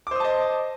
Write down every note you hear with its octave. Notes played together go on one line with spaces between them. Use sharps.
C5 D#5 A5 D6 D#6